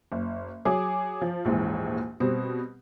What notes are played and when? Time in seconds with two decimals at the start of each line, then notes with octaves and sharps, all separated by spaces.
0.12 F#1
0.65 F#3 G#4 D6
1.22 F3
1.45 A#1 D#2 G#2 E3 G#3
2.20 B2 G3 C4